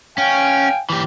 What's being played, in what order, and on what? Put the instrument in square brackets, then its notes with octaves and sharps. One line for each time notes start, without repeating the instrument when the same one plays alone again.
[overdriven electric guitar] C#4 [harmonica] F5 G5 G#5
[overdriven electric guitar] E3 G4